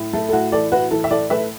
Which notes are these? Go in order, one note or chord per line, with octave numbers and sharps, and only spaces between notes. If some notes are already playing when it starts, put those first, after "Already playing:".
Already playing: A2
A3 A4
A4
A2 F#4
E3 A4 D5
A2 F#4 B4
E3 A4
E5
A2 A4 D5
A3 B4 E5